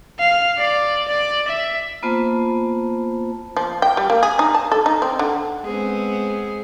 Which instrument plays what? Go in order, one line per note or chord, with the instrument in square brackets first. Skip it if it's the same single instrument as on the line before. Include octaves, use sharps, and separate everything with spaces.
[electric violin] F5
D5
D5
E5
[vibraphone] A#3 B3 F4 C5 A5
[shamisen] F3
G5
G3
A#3
G#4
D#4
A5
A4
D#4
C4
D3
[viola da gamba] G#3 B3 C4 [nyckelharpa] G#4